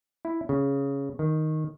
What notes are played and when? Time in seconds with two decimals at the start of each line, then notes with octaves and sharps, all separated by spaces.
0.25 E4
0.49 C#3
1.19 D#3